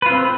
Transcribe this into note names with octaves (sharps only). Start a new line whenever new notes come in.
C4 F4 B4